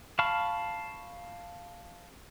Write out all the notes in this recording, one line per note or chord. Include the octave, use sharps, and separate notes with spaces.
F5 A5 B5 C#6 F6